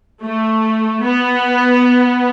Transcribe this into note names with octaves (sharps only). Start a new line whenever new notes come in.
A3
B3